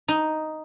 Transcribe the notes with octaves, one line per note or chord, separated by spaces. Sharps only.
D#4